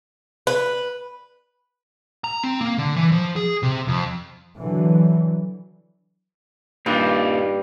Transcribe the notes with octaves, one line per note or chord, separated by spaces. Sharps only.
B4
A#5
C4
A#3
D3
E3
F3
G#4
C3
F2
D3 E3 F#3
G2 A#3 D#4 F4